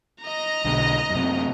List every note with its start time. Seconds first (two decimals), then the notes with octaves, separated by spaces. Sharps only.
0.23 D#5 A#5
0.64 B1 D3
1.10 F#2 C3